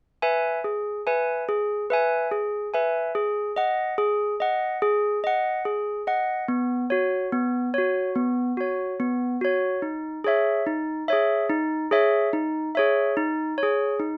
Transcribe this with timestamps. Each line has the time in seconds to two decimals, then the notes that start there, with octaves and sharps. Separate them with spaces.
0.22 B4 E5 G#5
0.64 G#4
1.07 B4 E5 G#5
1.49 G#4
1.90 B4 E5 G#5
2.32 G#4
2.74 B4 E5 G#5
3.15 G#4
3.56 D#5 F#5
3.98 G#4
4.40 D#5 F#5
4.82 G#4
5.24 D#5 F#5
5.65 G#4
6.07 D#5 F#5
6.48 B3
6.90 F#4 C#5
7.32 B3
7.74 F#4 C#5
8.15 B3
8.57 F#4 C#5
9.00 B3
9.41 F#4 C#5
9.82 D#4
10.24 G#4 C#5 E5
10.66 D#4
11.08 G#4 C#5 E5
11.50 D#4
11.91 G#4 C#5 E5
12.33 D#4
12.75 G#4 C#5 E5
13.17 D#4
13.58 C#5
13.63 G#4
14.00 D#4